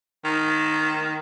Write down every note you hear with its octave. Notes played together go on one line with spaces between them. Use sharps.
D#3